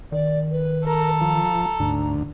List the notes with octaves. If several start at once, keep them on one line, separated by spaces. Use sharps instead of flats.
D#3 D5
B4
A4 A#4 A#5
F3
D2 G#2